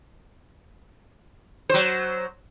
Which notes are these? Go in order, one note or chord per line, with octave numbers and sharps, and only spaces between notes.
F#3 C5